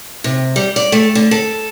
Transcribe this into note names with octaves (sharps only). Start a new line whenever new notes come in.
C3
G3
D5
A3
D3
A4